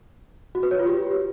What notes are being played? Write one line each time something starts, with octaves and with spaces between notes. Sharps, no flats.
F#4
B4
C#5
F4
G4